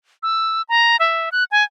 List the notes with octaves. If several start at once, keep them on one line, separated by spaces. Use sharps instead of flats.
E6
A#5
E5
F#6
G#5